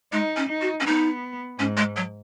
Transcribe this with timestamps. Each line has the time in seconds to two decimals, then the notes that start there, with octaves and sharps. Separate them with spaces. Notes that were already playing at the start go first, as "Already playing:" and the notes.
0.13 G#3 D#4
0.37 C#4
0.49 D#4
0.61 F#4
0.80 C#4
0.86 B3 D#4
1.59 G#2 C#4
1.77 G#3
1.96 F#3